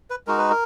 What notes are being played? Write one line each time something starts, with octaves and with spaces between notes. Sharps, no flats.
B4
G#3 D#4 F#4 A#4
B4
A#4